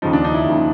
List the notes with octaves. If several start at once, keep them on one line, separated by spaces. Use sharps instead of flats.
D#2 C#3 F3 D#4
D4
D#4
E4
D#2 C#3 F3